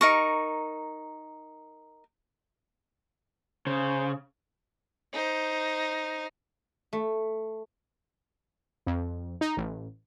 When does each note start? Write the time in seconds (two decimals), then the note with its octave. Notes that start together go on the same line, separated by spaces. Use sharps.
0.01 D#4 A#4 C#6
3.67 C#3 C5
5.13 D#4 C5
6.93 A3
8.87 F2
9.41 D#4
9.57 A1